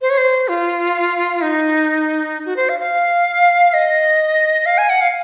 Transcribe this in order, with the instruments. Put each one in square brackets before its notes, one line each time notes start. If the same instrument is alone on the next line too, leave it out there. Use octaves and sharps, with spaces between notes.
[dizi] C5
C#5
C5
F4
D#4
F#4
C5
F5
F5
D#5
F5
G#5
F#5
F5